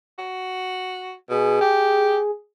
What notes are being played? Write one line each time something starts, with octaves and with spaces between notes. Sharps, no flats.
F#4
B2 G#4
G4